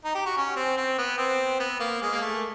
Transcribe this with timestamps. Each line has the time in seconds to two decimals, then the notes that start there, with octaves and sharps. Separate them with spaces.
0.05 D#4
0.15 G4
0.26 F#4
0.37 C#4
0.56 C4
0.77 C4
0.98 B3
1.18 C4
1.60 B3
1.80 A#3
2.02 G#3
2.12 A#3
2.21 A3